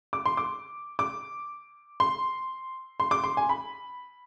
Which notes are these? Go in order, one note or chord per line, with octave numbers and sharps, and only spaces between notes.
D6
C6
D6
D6
C6
C6
D6
C6
G#5
B5